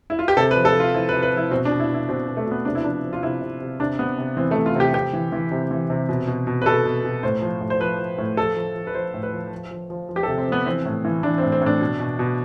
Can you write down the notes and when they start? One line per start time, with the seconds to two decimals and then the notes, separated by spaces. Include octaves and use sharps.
0.10 E4
0.19 F4
0.28 G4
0.37 C3 A4
0.51 B4
0.56 F3
0.65 A4
0.75 F3
0.80 F4
0.94 F3 E4
1.09 B4
1.13 C3
1.22 B4
1.32 F3 E4
1.51 B2 C4
1.65 D4
1.70 B2
1.80 E4
1.89 B2
1.94 E4
2.08 B2 C4
2.27 B2
2.37 A3
2.46 B2 B3
2.65 C3 D4
2.75 E4
2.84 F3 D4
3.04 F3
3.13 F4
3.23 C3 E4
3.42 C3
3.61 C3
3.80 C3 D4
3.99 C3 B3
4.18 C3
4.37 E3 C4
4.51 A3
4.56 C3
4.66 F4
4.75 C3 G4
4.94 C3 G4
5.13 E3
5.32 E3
5.51 C3
5.71 E3
5.90 C3
6.09 B2
6.27 B2
6.47 B2
6.62 B4
6.66 B2 A4
6.85 B2
7.04 B2
7.23 A2 C5
7.42 F3
7.61 A2
7.70 C5
7.80 F3 B4
7.99 F3
8.18 A2
8.37 F3 A4
8.56 F3
8.76 F3
8.87 B4
8.94 F3 C5
9.14 A2
9.23 B4
9.33 F3
9.52 F3
9.71 F3
9.90 F3
10.09 F3
10.16 G4
10.23 A4
10.28 C3
10.38 C4
10.47 F3 B3
10.66 E3 C4
10.85 A2
11.05 E3
11.23 E3 D4
11.38 C4
11.42 A2
11.52 C4
11.61 A2 D4
11.81 B2
12.00 B2
12.19 B2